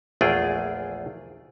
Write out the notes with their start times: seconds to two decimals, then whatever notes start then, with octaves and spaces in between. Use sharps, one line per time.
0.21 A#1 E2 A3 F4 G#4 G5